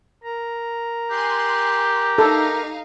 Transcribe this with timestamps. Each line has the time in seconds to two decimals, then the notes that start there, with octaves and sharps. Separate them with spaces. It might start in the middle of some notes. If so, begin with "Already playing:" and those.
0.23 A#4 A#5
1.11 G4 G#5 C6 F#6
2.18 D#4 A4 F5